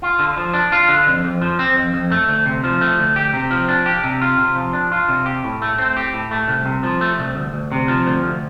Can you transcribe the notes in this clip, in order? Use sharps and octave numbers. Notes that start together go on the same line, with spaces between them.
F4
D3
F3
D4
F4
D3
F2
F2
F3
C4
F2
F2
A3
D2
C3
F3
A3
D2
G4
C3
F3
D4
G4
C3
F4
C3
F3
D4
F4
C3
G4
A2
A3
C4
G4
A2
A3
C2
C3
F3
A3
C2
D2
D2
C3
F3
D2
D2